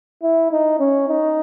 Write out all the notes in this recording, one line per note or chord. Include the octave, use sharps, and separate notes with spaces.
E4
D#4
C#4
D#4